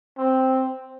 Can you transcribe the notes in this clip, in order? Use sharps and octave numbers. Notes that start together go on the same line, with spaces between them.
C4